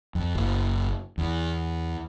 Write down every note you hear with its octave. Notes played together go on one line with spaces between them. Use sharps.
F2
F#1
E2